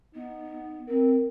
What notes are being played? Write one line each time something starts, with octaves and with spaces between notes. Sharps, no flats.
B3 D#4
C4 A#4